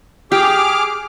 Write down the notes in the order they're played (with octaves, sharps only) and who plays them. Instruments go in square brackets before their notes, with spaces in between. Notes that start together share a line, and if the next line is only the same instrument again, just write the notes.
[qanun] G4 [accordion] G#4 D6 F6